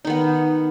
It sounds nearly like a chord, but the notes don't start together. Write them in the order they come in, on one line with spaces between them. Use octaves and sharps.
D#4 D#3 B3